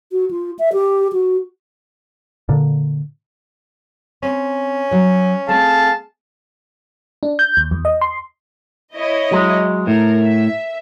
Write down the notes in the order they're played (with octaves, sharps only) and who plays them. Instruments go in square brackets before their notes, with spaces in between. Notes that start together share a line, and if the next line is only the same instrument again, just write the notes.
[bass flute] F#4
F4
E5
G4
F#4
[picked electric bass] A#2 D3
[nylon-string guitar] C4 [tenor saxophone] C#4
[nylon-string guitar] F#3 C#5
[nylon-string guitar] A3 C4 [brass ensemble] G#4 F5 A5
[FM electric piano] D4
G6
D#2
E2
D#5
C6
[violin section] E4 C#5 D#5
[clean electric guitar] F#3 G#3
[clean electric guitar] A2 [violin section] A#4
[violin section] E5